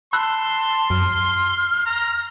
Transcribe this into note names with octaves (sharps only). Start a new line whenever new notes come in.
A5 B5 C6 E6 F#6
F#2 F6
A#5